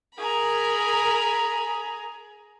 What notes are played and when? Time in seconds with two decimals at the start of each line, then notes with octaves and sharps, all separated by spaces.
0.18 G#4 A#4 A#5 B5